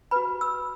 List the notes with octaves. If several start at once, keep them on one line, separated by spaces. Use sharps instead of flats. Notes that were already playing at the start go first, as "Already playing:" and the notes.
F#4 B4 B5
E6